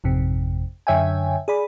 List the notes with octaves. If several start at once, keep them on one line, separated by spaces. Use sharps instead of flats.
G#1 F2 C3
F#2 D3 C#5 E5 G5 G#5
G#4 D5 B5